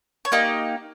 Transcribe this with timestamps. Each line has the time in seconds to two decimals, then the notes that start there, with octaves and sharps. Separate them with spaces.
0.25 C#5
0.32 A#3 D#4 G4 D5